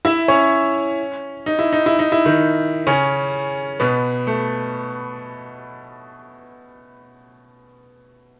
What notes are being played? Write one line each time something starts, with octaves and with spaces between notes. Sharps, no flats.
E4 E5
C#4 C#5
D#4
E4
D#4
E4
D#4
E4
D#3 D#4
C#3 C#4
B2 B3
A3